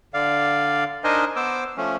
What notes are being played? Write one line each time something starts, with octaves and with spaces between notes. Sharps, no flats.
D3 D5 F5
D4 D#4 A#4 C5 D#5 G#5
B3 C5 D6 E6
F3 A3 C#4